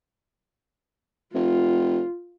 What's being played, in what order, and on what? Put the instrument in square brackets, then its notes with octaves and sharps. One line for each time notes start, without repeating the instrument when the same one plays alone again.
[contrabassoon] F1 [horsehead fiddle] F4